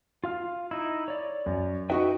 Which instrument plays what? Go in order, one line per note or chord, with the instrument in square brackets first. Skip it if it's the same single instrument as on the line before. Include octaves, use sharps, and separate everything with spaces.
[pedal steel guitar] F4 F5 F6
D#4 E4
C#5 D5
[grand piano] F#2
[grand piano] D#4 F#4 C#6 [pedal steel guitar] B4 E5 G5